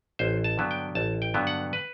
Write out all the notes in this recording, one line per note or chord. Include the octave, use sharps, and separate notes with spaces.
A1 C5
A5
G2 D3 F#3 B3
G5
A1 A5
G5
G2 D3 F#3 B3
F#5
B4